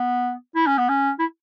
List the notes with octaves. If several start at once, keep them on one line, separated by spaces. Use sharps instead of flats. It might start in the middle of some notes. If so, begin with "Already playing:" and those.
Already playing: B3
E4
C#4
B3
C#4
E4